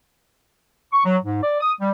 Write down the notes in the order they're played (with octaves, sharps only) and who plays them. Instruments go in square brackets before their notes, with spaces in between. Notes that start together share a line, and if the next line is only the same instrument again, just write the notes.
[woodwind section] C#6
F#3
G#2
D5
D#6
G3